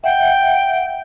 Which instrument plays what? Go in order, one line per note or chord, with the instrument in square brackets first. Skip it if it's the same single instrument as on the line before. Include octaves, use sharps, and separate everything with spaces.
[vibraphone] E5 F#5 [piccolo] G5